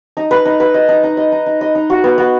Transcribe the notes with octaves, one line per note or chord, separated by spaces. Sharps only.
D#4
B4
D#4
B4
D#5
D#4
D#4
D#5
D#4
D#4
D#5
D#4
F#4
B3
B3